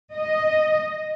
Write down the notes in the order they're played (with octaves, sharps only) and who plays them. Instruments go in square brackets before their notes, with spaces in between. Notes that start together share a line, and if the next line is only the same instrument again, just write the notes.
[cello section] D#5